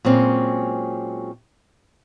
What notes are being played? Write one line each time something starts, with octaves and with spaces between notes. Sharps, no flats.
A#2 F#3 G#3 C4 C#4